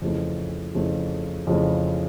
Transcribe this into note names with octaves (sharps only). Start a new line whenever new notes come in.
F2 C#3 E3 A3
F2 C#3 E3 A3
F2 C#3 E3 A3